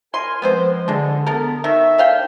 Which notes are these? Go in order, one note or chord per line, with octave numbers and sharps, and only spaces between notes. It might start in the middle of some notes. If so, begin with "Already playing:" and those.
A#4 G#5 C6
F3 G#3 B3 C4 C5
D3 G#3 D4
B3 A4 A#4
D#3 E5 C#6
D3 F5 G5